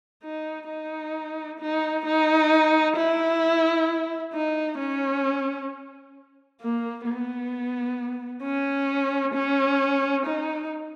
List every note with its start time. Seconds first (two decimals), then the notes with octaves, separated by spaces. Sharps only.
0.23 D#4
0.69 D#4
1.60 D#4
2.05 D#4
2.96 E4
4.33 D#4
4.78 C#4
6.61 A#3
7.07 B3
8.43 C#4
9.34 C#4
10.26 D#4